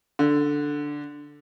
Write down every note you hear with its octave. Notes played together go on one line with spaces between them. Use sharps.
D3